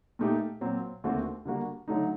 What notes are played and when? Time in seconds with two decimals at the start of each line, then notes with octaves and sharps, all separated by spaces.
0.19 A#2 A3 D#4 G4
0.61 A#2 F#3 C4
1.04 D#2 D3 A3 C4 F#4
1.45 D3 G3 A#3 F#4
1.88 D3 F#3 A3 D#4